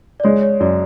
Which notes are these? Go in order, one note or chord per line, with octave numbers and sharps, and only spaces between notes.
D5
G#3 C#5
C#5
F#2 D5